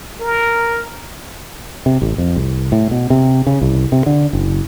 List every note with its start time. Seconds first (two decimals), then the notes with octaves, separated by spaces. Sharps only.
0.20 A#4
1.86 C3
2.02 A1
2.18 F2
2.36 C2
2.72 A2
2.91 B2
3.10 C3
3.47 C#3
3.61 C2
3.92 C3
4.06 D3
4.33 F#1